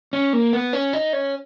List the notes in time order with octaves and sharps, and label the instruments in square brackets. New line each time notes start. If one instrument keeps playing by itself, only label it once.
[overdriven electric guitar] C#4
A#3
B3
C#4
D#4
C#4